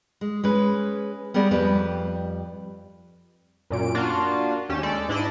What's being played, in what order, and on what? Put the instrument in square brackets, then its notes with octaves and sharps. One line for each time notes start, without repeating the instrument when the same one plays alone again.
[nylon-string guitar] G#3
G#3 C#4 B4
G3 B3 G#4 A#4 D5
F2 G3 B4
[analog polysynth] F#2 A#2 D7
A#3 D4 F4 F#4
D#2 C#4 G4 E7
G#3 A4 D5
G#2 D4 E4 D5 D#5 A6